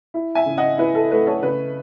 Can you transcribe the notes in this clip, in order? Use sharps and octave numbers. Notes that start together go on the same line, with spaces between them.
E4
E5 G#5
C#3
D#5 F#5
E4 B4
A4
A3 B4
A4 C#5
C#3 B4